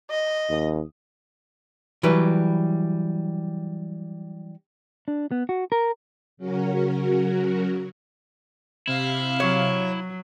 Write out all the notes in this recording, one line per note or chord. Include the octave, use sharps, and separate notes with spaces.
D#5
D#2
E3 F#3 G3 B4
D4
B3
F#4
A#4
C#3 F#3 C#4 F#4 A#4
C3 E4 F5
F#3 C#5